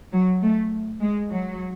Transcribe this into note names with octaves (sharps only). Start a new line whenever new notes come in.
F#3
A3
G#3
F#3